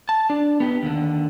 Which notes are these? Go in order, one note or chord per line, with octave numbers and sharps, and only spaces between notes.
A5
D4
B3 G4
D#2 D3